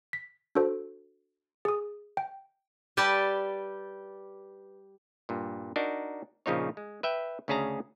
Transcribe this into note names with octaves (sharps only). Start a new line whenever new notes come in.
B6
D4 F#4 A4 C5
G#4 D#6
G5
G3 G4 B4 D5 A5
G2 A#2
D4 D#4 F#4 A#4
A#1 C#3 F3 D#4 C#5
G#3
B4 E5 G5
D2 C#3 C#4 G#4 A5 A#5